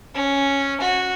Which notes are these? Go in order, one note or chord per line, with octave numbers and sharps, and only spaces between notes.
C#4
F#4